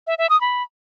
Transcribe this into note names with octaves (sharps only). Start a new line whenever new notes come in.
E5
E5
D#6
B5